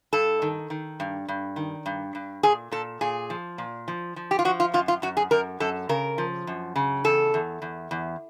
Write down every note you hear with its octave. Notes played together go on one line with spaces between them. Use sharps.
G2 A4
D#3
D#3
G2
G2
D#3
G2
G2
A#2 G#4
A#2 A4
A#2 G#4
F3
A#2
F3
F3
G4
F4
F3 F#4
F4
F#2 F4
F4
F#2 F#4
G#4
F#2 A#4
F#2 A4
C#3 A#4
F3
F#2
C#3
E2 A4
E2
E2
E2